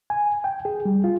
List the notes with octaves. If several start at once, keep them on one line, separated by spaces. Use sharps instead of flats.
G#5
G5
G#4
G3
F4